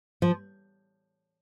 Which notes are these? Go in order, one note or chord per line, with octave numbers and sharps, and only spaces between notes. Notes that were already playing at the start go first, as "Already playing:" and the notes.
F3